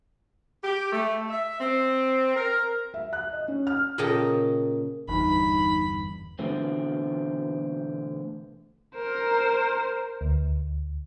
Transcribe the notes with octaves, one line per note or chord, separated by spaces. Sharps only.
G4
A3
E5
C4
A#4
E5
F#6
D#5
C#4
F6
A#2 C#3 A#3 D#5 G5 A5
G1 E2 G2 D#4 B5
B2 D3 E3 A3 C4
A#4 C5
D2